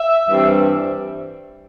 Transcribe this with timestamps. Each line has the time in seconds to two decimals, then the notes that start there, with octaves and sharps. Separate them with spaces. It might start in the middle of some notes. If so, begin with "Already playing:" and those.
Already playing: E5
0.27 G2 E3 G3 C4